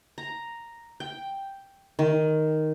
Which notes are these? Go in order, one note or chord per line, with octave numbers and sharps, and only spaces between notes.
A#5
G5
D#3